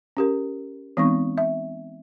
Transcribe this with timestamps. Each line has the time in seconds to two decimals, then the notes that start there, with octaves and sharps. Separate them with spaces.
0.17 C#4 G4 A#4
0.97 E3 G#3 B3 C4 D#4 C#6
1.38 E5